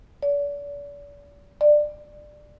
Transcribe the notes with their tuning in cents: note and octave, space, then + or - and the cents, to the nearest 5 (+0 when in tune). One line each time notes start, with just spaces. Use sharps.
D5 -40
D5 +20